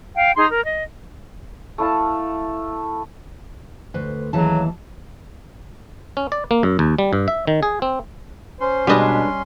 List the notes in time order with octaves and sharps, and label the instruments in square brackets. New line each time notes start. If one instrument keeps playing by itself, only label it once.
[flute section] F5 G5
D#4 G#4 C6
A#4
D#5
[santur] A3 E4 F5 A5
[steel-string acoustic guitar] D2 B4 C5
[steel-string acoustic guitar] D#2 E3 A5 [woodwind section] C#3 F#3
[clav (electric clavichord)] C#4
D5
A#3
F#2
D#2
G3
G2
E5
D#3
G#4
C4
[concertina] C#4 C6 [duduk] C5
[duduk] B2 [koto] G3 D#5 [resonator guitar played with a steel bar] G#3 D4 B4